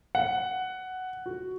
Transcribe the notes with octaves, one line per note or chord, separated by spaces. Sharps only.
F#5
F#4